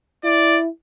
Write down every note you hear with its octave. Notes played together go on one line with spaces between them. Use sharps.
E4 D5